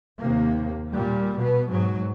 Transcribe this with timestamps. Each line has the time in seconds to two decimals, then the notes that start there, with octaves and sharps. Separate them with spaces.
0.19 D#2 C3 A#3
0.91 A#2 G3
1.36 B2 B3
1.70 G#2 F#3